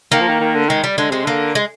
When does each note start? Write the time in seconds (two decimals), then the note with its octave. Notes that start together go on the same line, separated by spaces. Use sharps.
0.12 D#3 A#3
0.21 F3
0.28 D#3
0.41 D#3
0.55 D3
0.69 D#3 G#3
0.84 G3
0.98 D3 G#3
1.10 C3 G#3
1.24 D3 A#3
1.55 G#3